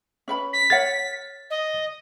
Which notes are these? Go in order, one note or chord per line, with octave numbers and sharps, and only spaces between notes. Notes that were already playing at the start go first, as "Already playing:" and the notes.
C#4 B4 B5
B6
A#4 C#5 F#5 A6
D#5